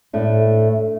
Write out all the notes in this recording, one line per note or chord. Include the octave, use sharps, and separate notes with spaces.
A2 A3 D4